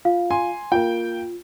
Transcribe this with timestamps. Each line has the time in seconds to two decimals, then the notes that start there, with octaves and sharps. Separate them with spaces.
0.05 F4 F5
0.30 G#5 C6
0.72 A#3 F4 G5